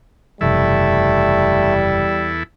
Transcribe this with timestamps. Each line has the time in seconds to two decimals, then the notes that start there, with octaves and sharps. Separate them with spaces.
0.41 F#1 E2 C3 F3 G3 A3 E4 A4